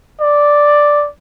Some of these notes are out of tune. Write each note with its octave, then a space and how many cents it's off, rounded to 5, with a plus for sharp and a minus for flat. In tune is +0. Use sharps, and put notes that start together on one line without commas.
D5 +0